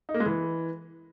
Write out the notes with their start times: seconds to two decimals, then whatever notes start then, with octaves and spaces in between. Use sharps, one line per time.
0.09 D#4
0.14 A#3
0.20 G#3
0.26 E3